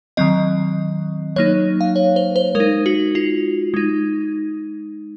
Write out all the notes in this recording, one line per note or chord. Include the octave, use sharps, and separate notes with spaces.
D#3 F#3 C4 D#5
F#3 A#3 D#4 C#5
F5
C#5
C5
C5
G#3 A#4
D#4
F#4
F4
G#3 D#4